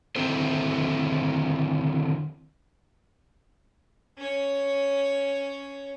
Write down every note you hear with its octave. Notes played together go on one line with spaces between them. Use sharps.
D3 D#3 C4 E4 A4 C5
C#4 C#5